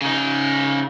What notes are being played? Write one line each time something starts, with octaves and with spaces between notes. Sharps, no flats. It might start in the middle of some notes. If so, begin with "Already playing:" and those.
C#3 D#4